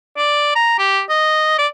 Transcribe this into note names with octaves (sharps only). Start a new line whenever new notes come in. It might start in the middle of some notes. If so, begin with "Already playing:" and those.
D5
A#5
G4
D#5
D5